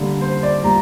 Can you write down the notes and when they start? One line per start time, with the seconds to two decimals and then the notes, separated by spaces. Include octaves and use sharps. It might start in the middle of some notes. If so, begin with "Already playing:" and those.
Already playing: D3 G3 A#3
0.21 C5
0.43 D5
0.63 A#2 G3 A#3 A#5